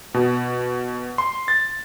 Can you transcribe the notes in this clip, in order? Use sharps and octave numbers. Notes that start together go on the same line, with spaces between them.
B2
C6
A6